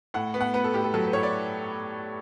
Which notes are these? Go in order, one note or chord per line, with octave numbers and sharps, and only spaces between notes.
A2 F#5
B3
F#5
B3 B4
A4
A2 G4
A4
F#3 A4
B4
A2 C#5
D5